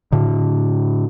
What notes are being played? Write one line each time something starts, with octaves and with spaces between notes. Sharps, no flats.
A2 D3